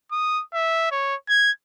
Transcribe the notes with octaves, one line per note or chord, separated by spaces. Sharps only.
D#6
E5
C#5
G#6